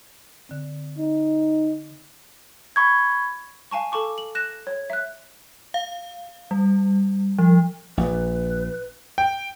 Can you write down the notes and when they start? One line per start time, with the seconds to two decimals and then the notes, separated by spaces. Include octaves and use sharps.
0.49 D3 C4
0.98 D#4
2.76 B5 C#6 G#6
3.71 F5 G#5 A5 C#6
3.92 A4 A5 C#6 D6
4.18 F#7
4.35 F#6 A#6 E7
4.67 C#5
4.90 E5 F#6
5.74 F5
6.51 G3
7.38 F3
7.97 A#1 A#2 B4
9.18 G5